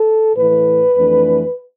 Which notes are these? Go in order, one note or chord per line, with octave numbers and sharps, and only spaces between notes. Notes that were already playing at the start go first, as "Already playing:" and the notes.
Already playing: A4
A2 E3 A3 B4
F2 E3 A3 D4